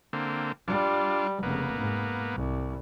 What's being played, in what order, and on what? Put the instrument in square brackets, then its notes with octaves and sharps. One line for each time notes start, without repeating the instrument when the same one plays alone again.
[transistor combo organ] D3 A#3 C4
[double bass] G3 [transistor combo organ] D4 F4
[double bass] F1 C#3 [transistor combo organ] A#3 B3
[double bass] G#2
C2